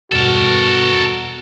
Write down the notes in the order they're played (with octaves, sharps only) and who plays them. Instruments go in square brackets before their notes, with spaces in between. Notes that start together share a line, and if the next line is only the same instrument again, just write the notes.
[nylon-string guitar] E2 G2 B2 [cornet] F#4 [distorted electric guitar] A4 A#4